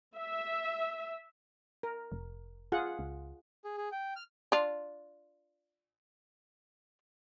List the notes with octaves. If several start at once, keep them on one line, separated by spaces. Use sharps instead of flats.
E5
A#4
F1
F4 G#4 F#5
C#2
G#4
G#4
G5
F6
D4 F4